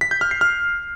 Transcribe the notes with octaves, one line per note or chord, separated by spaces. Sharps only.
B6
G6
F6
C7
F6